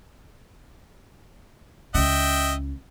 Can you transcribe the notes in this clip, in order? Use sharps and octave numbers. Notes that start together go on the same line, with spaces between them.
C#2 C#3 D#5 E5 G5